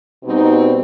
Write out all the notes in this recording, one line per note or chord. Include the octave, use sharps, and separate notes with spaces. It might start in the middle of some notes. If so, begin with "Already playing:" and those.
B2 G3 C4 D#4